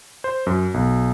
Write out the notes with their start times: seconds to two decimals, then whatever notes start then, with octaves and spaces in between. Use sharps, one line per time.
0.24 C5
0.47 F#2
0.74 B1